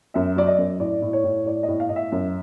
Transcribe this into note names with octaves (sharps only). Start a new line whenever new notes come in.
F#2 E5
F#3 D5
D#5
F#2
A2 D5
A2
C#5
A2
A2 D5
D#5
A2
F5
A2 D#5
E5
F#2